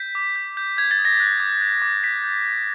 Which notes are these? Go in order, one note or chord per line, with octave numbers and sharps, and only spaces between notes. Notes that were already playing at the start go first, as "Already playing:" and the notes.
Already playing: G6 B6
D6
G6
G6
G6 G#6
A6
D#6
A#6
F#6
D6
F#6
D6
G6 B6
G6
G6